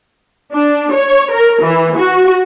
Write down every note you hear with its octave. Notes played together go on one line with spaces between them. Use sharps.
D4
C#5
A#4
E3
F#4